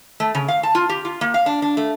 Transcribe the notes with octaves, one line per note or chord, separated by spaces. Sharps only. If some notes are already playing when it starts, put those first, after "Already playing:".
A3
C#3
F5
A5
F4
G4
F4
A#3
F5
D4
D4
A3